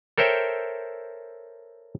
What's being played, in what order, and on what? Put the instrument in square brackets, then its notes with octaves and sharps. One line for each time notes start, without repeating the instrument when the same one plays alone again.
[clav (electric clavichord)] A4 A#4 C5 C#5 E5 G5